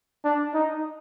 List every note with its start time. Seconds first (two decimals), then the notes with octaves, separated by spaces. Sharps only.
0.25 D4
0.54 D#4